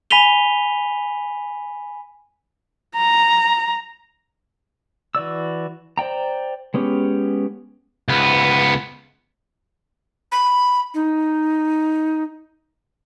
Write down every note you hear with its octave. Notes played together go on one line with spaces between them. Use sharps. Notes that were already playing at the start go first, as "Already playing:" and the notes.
G#5 B5 B6 D#7 F7 G7
A#5
E3 F#4 D5 E6
C5 D5 G5 A#5
G#3 B3 C#4 G4
C#2 B3
B5
D#4